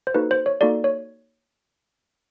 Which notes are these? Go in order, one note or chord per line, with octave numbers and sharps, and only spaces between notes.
C5
A#3 D#4 F#4 A4 B4
C5
C#5
A#3 D#4 F#4 A4 D5
C#5